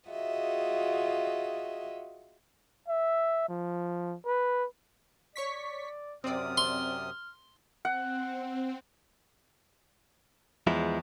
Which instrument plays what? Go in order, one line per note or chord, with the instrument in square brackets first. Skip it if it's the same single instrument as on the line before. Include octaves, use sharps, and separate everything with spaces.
[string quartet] F4 F#4 G#4 D#5 E5
[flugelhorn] E5
F3
B4
[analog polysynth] C#5 C#6 B6 [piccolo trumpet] D5
[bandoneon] F#2 C3 D#6 [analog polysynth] C4 D5 [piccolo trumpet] F6
[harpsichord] C6
[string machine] C4 [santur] F#5
[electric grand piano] E2 [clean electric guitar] F3 G#3 E4